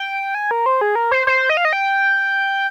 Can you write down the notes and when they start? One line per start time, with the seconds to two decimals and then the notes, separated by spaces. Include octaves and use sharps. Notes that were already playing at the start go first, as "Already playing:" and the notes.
Already playing: G5
0.35 G#5
0.51 A#4
0.66 C5
0.81 G#4
0.95 A#4
1.11 C5
1.27 C5
1.49 D#5
1.57 F5
1.65 D#5
1.73 G5